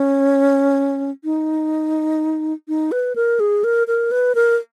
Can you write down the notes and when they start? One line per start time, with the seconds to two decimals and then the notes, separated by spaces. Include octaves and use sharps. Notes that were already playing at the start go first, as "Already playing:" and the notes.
Already playing: C#4
1.24 D#4
2.68 D#4
2.92 B4
3.16 A#4
3.40 G#4
3.64 A#4
3.87 A#4
4.11 B4
4.35 A#4